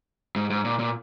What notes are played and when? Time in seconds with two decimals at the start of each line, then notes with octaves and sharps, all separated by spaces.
0.36 G#2
0.50 G#2
0.65 A#2
0.79 A#2